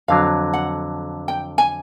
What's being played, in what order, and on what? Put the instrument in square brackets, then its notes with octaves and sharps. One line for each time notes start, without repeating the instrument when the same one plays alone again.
[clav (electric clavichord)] F2 D3 F#3 [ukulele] F5
[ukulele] F#5
G5
G#5